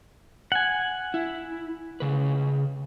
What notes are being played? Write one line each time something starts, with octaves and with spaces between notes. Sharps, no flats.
F#5 G#5
E4
C#3 B4